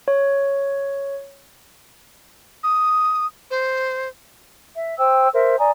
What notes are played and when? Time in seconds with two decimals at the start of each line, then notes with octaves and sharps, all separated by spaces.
0.08 C#5
2.63 D#6
3.51 C5
4.75 E5
4.98 C5 G5 E6
5.33 A#4 C5 E5
5.58 D5 G#5 A#5 D#6